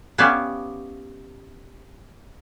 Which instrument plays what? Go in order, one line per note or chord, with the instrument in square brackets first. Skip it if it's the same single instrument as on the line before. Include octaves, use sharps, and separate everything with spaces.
[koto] B3 C#4 E4 G4 D5 F5